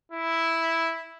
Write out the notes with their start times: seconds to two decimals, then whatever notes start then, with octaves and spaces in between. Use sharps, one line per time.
0.12 E4